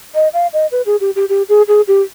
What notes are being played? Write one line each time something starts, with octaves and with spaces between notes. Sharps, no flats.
D#5
F5
D#5
B4
G#4
G4
G4
G4
G#4
G#4
G4